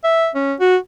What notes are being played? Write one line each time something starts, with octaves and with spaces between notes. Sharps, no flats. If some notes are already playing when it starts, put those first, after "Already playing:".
E5
C#4
F#4